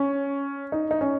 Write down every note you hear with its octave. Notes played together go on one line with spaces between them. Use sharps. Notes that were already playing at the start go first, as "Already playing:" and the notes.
Already playing: C#4
D#4
D#4
C#4